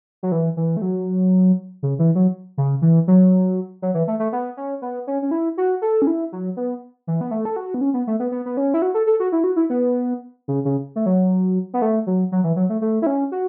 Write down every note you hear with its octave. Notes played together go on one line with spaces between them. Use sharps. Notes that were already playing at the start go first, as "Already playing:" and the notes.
F#3
E3
E3
A3
F#3
C#3
E3
F#3
C#3
E3
F#3
F#3
E3
A3
A3
B3
C#4
B3
C#4
C#4
E4
F#4
A4
C#4
E4
F#3
B3
E3
B3
A3
A4
F#4
B3
C#4
B3
A3
B3
B3
B3
C#4
E4
F#4
A4
A4
F#4
E4
F#4
E4
B3
C#3
C#3
A3
F#3
B3
A3
F#3
F#3
E3
F#3
A3
A3
E4
C#4
F#4